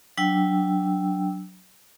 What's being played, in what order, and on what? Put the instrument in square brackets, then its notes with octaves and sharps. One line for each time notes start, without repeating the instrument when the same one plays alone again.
[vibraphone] F#3 D4 G5 E6